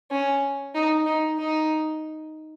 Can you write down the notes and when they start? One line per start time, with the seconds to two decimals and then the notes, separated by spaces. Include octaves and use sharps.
0.11 C#4
0.75 D#4
1.06 D#4
1.39 D#4